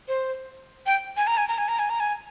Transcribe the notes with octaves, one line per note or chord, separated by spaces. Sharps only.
C5
G5
G#5
A#5
G#5
A#5
G#5
A#5
G#5
A#5
G#5